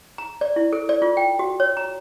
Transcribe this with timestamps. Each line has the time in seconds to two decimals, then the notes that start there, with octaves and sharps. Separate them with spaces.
0.18 A#5
0.41 D5
0.56 E4
0.73 A4
0.89 D5
1.02 F4
1.17 G5
1.39 F#4
1.60 C#5
1.77 A#5